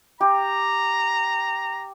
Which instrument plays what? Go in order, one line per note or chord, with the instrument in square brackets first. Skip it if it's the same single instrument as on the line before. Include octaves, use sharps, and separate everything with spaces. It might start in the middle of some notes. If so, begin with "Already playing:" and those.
[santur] G4 [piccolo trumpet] A#5